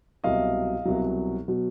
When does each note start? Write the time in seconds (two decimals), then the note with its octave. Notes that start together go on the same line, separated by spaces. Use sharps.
0.24 C2 B2 F#3 D#5 F5
0.85 C2 B2 F#3
1.48 B2 F#3